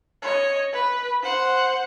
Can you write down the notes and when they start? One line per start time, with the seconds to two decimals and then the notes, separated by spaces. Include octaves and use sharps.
0.22 C#5 D#5
0.73 B4
1.23 C5 F#5